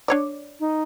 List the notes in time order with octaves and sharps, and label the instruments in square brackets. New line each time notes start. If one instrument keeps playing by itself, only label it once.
[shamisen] D4 C#5 D5
[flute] D#4